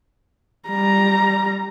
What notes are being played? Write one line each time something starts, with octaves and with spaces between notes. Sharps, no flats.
G3 A#5